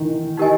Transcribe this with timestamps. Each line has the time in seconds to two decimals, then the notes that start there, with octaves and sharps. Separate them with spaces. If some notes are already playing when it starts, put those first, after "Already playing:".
Already playing: D#3 E3
0.37 D#4 G4 A#4 D#5 G#5